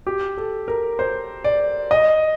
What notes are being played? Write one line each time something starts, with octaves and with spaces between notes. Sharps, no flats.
G4
A4
A#4
C5
D5
D#5